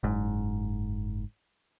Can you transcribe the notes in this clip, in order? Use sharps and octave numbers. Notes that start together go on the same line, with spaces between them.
F#1 G#2